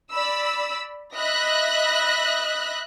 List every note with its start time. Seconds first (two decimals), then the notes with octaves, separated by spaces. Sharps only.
0.11 D5 B5 E6
1.15 D#5 E5 B5 F#6 A#6